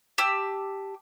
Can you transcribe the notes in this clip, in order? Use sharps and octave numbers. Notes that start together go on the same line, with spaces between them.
G4 A5 E6